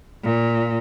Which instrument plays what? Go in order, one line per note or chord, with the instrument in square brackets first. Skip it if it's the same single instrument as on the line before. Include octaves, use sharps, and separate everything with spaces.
[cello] A#2